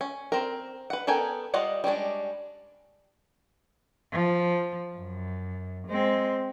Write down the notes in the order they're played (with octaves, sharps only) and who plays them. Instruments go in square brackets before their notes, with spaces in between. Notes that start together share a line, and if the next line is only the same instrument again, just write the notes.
[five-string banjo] C#4
C4 A#4
B4 F#5
B3 A4 A#4 G5 G#5
G3 F4 D#5 F5 F#5
G3 G#3 C#4 D4
[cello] F3
F#2
G#3 C4